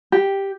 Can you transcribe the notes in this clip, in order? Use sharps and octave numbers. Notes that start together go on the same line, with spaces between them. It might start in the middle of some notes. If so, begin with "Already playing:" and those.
G4